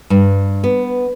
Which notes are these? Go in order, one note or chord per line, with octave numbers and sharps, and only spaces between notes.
G2
B3